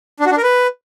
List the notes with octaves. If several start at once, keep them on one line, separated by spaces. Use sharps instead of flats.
D4
F#4
D4
A#4
B4